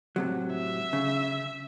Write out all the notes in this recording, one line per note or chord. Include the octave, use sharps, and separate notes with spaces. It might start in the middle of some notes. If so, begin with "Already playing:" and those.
A2 C3 F#3
E5
C#3